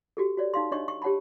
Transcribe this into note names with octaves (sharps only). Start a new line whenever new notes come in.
F#4 G4 A4
F#4 C#5 D5
D#4 F5 C6
D4 C#5 D#5 C#6
C#6
G4 C#5 F#5 A5 B5